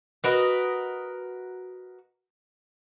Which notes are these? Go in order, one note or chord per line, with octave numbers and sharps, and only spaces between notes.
F#4 A#4 B4 D#5